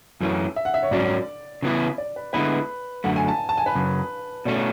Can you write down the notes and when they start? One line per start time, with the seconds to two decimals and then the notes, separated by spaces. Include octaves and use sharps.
0.21 F#2 E3 A3 C#4
0.56 E5
0.65 F#5
0.74 E5
0.82 C#5
0.91 G#2 F#3 C#4 D5
1.62 C#3 E3 B3 E4
1.98 D5
2.16 B4
2.33 D3 G#3 B3 E4 B4
3.04 F#2 D3 A3 F#5
3.16 G#5
3.28 A5
3.49 A5
3.57 G#5
3.66 B4
3.75 F#2 C#3
4.45 B2 A3 C#4 D5